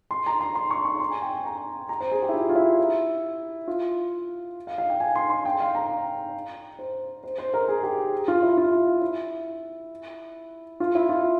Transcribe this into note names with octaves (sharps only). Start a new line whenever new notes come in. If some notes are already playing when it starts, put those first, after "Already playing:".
C6
A#5
C6
C6
C#6
C#6
C6
G#5
G5
G#5
A#5
A#5
C5
G#4
G4
E4
F4
F4
E4
F4
F5
F5
G5
G#5
C6
C6
G5
F5
A#5
C5
C5
C5
A#4
G#4
G4
F4
E4
F4
E4
F4
E4
F4